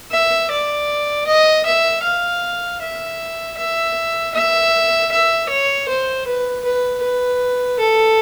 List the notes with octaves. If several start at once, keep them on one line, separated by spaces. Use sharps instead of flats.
E5
D5
D#5
E5
F5
E5
E5
E5
E5
C#5
C5
B4
B4
B4
A4